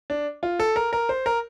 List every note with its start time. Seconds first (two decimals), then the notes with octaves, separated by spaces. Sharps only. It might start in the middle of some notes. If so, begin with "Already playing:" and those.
0.10 D4
0.43 F4
0.60 A4
0.76 A#4
0.93 A#4
1.09 C5
1.26 A#4